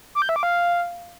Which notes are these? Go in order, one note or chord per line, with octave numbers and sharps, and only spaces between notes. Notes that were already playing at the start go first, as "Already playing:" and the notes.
D6
G6
E5
D6
F5